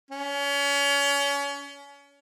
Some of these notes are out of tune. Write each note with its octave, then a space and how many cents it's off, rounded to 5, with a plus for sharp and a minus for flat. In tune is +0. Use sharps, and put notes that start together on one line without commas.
C#4 +30